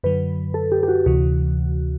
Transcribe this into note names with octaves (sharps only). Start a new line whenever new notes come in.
F#2 D3 F#3 B4
A4
G4
G4
F#4
D2 C3 E3 F#4